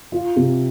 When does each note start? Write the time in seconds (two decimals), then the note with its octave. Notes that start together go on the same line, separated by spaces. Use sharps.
0.12 F4
0.36 C3